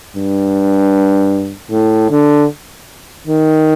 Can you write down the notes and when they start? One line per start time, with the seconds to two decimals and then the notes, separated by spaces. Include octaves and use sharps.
0.16 G2
1.71 A2
2.10 D3
3.26 D#3